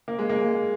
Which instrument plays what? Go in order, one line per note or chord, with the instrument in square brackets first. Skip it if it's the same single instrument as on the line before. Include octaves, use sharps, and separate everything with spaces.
[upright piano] A#3
G#3
A#3
G#3